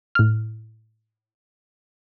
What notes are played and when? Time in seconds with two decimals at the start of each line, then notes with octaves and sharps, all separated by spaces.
0.15 A2 F6